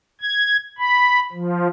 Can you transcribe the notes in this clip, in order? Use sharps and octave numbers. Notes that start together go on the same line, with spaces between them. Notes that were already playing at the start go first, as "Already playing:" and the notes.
G#6
B5
F3